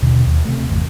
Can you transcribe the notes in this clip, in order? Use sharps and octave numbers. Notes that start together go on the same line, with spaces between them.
D#2 B2 D3
D#2
C3 A3
G1 E2